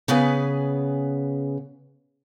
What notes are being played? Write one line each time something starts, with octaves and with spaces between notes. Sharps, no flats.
C#3 B3 G#4 B4 G#5